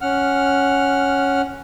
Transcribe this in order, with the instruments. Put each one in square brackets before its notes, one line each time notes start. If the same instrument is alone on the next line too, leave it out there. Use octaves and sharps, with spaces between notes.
[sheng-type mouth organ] C#4 F#5 F6